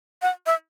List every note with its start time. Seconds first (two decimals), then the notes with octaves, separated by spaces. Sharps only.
0.22 F#5
0.46 E5